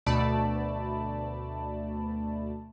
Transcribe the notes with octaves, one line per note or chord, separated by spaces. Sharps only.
D2 B2 A3 D5 A5 B5